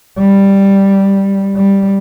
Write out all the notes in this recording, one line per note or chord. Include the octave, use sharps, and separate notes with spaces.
G3
G3